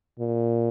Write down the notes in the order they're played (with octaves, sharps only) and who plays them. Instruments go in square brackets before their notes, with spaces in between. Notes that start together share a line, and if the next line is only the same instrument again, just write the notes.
[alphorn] A#2